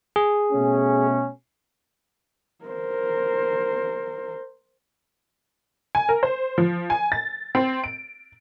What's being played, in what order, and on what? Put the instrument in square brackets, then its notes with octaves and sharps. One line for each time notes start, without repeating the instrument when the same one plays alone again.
[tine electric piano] G#4
[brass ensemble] B2 A3 C#4
[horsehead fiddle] A#4 C5
[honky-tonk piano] G#5
A#4
C5
F3
G#5
A6
C4
D7